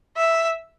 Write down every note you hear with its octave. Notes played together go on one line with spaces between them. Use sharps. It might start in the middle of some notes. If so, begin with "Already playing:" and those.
E5